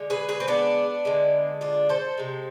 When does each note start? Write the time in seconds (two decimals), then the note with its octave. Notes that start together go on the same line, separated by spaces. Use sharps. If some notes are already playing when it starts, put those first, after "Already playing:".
Already playing: D3 G#3
0.10 G#4 B4
0.29 G#4 B4
0.40 C4
0.48 B3 D4
1.05 D3 G#3
1.61 D4 F4
1.89 A4 C5
2.18 C3 G#3